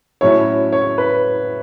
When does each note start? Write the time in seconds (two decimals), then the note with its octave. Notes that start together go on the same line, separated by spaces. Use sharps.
0.21 A2 F#3 C#4 E4 C#5
0.73 C#5
0.98 B4